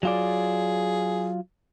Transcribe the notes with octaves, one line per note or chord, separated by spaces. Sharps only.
F#3 F4 G#4 D5